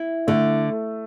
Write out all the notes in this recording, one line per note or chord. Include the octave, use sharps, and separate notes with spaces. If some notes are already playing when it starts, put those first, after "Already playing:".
Already playing: E4
D3 A3